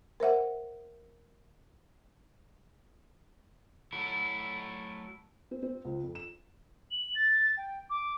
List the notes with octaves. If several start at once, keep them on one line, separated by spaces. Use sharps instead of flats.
A#4 C5 E5 F#5
F#3 A3 E4
C4
C4
C#2
F2
E7
F#7
A6
G5
D6